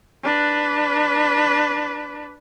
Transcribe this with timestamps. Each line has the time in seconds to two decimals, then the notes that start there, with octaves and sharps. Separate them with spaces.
0.24 D4 B4